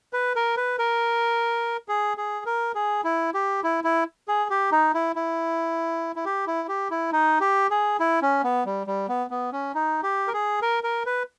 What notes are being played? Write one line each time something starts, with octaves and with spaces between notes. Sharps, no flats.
B4
A#4
B4
A#4
G#4
G#4
A#4
G#4
E4
G4
E4
E4
G#4
G4
D#4
E4
E4
E4
G4
E4
G4
E4
D#4
G4
G#4
E4
C#4
B3
G3
G3
B3
B3
C#4
D#4
G4
A#4
G#4
A#4
A#4
B4